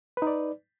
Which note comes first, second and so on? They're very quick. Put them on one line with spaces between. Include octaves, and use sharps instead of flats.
B4 D#4 D5